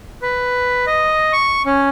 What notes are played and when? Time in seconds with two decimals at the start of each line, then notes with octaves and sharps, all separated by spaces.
0.22 B4
0.87 D#5
1.33 C#6
1.66 C#4